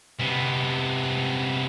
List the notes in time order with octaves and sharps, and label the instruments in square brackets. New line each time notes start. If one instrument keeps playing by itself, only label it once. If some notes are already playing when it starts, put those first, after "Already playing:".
[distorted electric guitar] C3 B3